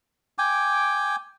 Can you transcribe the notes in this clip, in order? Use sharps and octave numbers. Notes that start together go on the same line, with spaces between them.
G5 G#5 D6